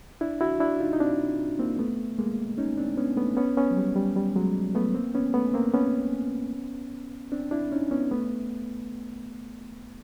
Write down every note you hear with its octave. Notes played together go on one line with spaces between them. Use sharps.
D4 E4
E4 F#4
D4 E4
D#4 F4
D#4
C4 D4
A#3 C4
A3 B3
G#3 A#3
C#4 D#4
C4 D4
B3 C#4
A3 B3
B3 C#4
B3 C#4
F#3
G3
G3
G3
F#3 G#3
A3 B3
A#3 C4
B3 C#4
A3 B3
A#3 C4
B3 C#4
C4 D4
D4 E4
C#4 D#4
B3 C#4
A3 B3